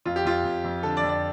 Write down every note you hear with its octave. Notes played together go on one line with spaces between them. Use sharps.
F2 F4
G4
F2 F4
F2
F2
D3 A4
D5
F2
D5